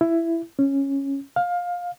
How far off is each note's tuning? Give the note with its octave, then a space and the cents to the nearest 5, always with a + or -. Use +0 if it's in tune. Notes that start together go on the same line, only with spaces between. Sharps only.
E4 +15
C#4 -10
F5 +20